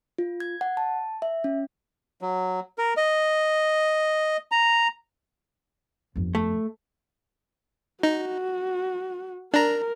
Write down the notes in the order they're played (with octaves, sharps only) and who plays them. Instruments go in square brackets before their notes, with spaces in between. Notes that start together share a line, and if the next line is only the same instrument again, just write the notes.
[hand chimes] F4
G#6
F#5
A5
E5
C#4
[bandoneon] F#3
A#4
D#5
A#5
[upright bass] G1 F2
[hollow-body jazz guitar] A3
[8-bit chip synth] D#4 [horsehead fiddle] F#4
[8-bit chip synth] D4 A#5 [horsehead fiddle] A#4